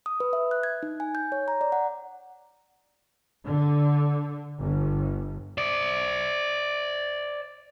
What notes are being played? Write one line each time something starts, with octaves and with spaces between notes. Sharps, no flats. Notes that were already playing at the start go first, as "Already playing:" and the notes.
D#6
B4
E5
F#6
G#6
D#4
G#5
G6
C#5
A#5
D5
F#5
D3
G1
C5 D5